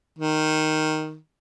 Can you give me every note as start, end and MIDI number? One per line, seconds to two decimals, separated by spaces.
0.19 1.16 51